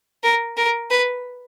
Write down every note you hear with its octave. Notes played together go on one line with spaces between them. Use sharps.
A#4
A#4
B4